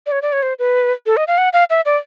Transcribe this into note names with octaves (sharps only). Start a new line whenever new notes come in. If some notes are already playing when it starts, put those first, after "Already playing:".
D5
C#5
D5
C#5
C5
B4
A4
D#5
F5
F#5
F5
E5
D5